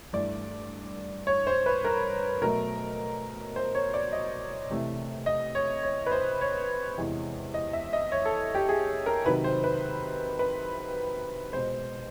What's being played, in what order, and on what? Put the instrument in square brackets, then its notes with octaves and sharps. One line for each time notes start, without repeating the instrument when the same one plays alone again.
[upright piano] G2 E3 A3 D5
C#5
C5
B4
A#4
B2 F#3 A3 A#4
C5
C#5
D5
D#5
C3 E3 A3
D#5
C#5
C#5
B4
C5
C#5
E2 C3 E3 G#3
D#5
E5
D#5
C#5
A4
G4
G#4
A#4
C3 D#3 F#3 B4
C5
B4
B4
B2 G#3 C5